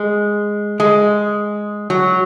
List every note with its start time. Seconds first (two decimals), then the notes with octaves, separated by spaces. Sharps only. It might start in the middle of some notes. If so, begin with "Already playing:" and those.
Already playing: G#3
0.80 G#3
1.90 F#3